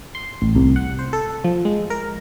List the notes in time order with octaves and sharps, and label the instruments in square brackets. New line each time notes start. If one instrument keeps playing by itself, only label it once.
[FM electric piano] C6
A1
C2
F#5
C5
A4
F3
G#3
A#4